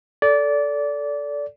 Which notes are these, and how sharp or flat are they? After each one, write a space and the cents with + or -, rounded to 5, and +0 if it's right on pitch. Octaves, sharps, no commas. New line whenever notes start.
A4 +0 D5 -20